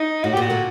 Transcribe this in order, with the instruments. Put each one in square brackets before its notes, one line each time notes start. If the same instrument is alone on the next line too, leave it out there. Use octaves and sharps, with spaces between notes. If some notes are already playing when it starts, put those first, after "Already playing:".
Already playing: [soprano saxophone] D#4
[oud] A2 [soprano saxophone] F#4
[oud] A#2 [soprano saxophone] G4
[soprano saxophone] F#4
[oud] A#2 D3